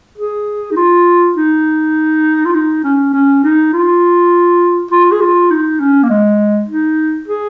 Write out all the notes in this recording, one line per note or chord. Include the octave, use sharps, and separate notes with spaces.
G#4
D#4
F4
D#4
F4
D#4
C#4
C#4
D#4
F4
F4
G#4
F4
D#4
C#4
A#3
G#3
D#4
G#4